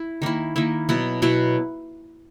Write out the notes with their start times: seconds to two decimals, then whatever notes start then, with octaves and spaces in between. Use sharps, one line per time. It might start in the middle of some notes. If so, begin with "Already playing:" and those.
Already playing: E4
0.22 D#3 A#3 E4
0.56 D#3 A#3 E4
0.89 B2 F#3 B3 E4
1.22 B2 F#3 B3 E4